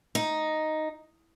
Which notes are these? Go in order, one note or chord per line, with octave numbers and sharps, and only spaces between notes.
D#4